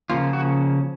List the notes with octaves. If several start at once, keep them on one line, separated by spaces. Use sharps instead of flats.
C#3 F3 A#3 C#4 F4
F#4